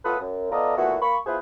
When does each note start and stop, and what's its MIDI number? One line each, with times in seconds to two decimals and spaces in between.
0.04 0.16 45
0.04 0.16 59
0.04 0.16 65
0.04 0.16 69
0.04 0.16 71
0.04 0.16 87
0.20 0.50 42
0.51 0.73 59
0.51 0.73 65
0.51 0.73 69
0.51 0.73 74
0.51 0.73 75
0.51 0.73 82
0.76 0.96 46
0.76 0.96 52
0.76 0.96 57
0.76 0.96 59
0.76 0.96 66
1.00 1.17 58
1.00 1.17 83
1.00 1.17 85
1.26 1.37 59
1.26 1.37 64
1.26 1.37 65
1.26 1.37 68
1.26 1.37 71
1.26 1.37 72